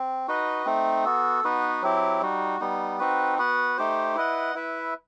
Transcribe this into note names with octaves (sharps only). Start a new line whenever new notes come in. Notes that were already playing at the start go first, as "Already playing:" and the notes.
Already playing: C4
D#4 F#4 B4 D#5
A3 C4 D#4
B3 F#4 A4
B3 D#4 F#4 B4
F#3 C4 E4 G4
G3 D#4 F#4
G3 B3 D#4
C4 D#4 F#4 B4
B3 F#4 B4 F#5
A3 D#4 G4 C5
E4 B4 D#5 F#5
E4 B4 E5